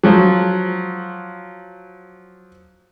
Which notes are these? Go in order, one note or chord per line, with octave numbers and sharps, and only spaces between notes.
F3 F#3